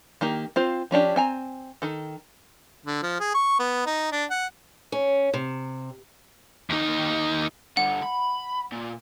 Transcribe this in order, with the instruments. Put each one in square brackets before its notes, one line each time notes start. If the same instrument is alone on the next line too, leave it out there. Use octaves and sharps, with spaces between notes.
[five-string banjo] D#3 A#3 G4
C4 F4 C5
F3 C#4 D4 G4
C4 G#5 A#5
D#3 A4
[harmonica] D3
F3
G#4
C#6
B3
D#4
D4
F#5
[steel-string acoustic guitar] C#4
C3
[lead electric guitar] D#2 D#4
[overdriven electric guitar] G2 D3 [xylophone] F#5
[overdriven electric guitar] B5
A#2